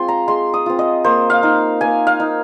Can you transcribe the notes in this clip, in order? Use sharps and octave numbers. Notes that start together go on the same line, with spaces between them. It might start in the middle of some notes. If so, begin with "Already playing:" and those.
Already playing: G#3 C4 F4 C6
A#5
G#3 C6
D#6
C4 F4
D#5
A#3 C5
F5
D#4
A#3 G#5
F5
D#4